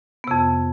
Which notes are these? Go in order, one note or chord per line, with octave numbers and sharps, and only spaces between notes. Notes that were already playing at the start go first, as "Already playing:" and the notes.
F2 C3 B3